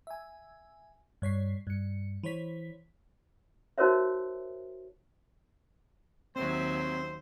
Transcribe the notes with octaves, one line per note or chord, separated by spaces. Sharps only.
E5 G#5
G2 C#5 B6 C7
G2 C#7
E3 C5 C#5 B6
D#4 F#4 A#4 C5 C#5 E5
D#2 F#3 C4 C5 E5